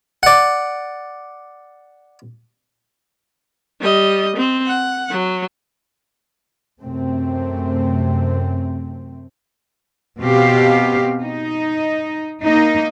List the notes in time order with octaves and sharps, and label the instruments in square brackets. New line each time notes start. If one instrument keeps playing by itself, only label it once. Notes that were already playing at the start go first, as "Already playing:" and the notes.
[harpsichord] D5 F#5
[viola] G3 D#5
C4
F#5
F#3
[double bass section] F#2 C3 A3 C4
[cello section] B2 C4 G4 F5
D#4
A#3 D#4